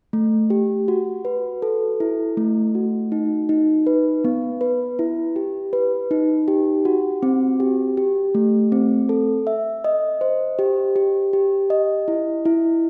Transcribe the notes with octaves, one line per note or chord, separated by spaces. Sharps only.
A3
G4
F#4
B4
A4
E4
A3
F#4
D#4
D#4
B4
B3
B4
E4
G4
B4
D#4
G4
F#4
C4
G4
G4
A3
C4
A4
E5
D#5
C5
G4
G4
G4
D#5
E4
E4